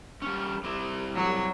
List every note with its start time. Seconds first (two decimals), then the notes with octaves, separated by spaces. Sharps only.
0.22 G3 C#4
0.64 G3 C4 E4
1.15 F#3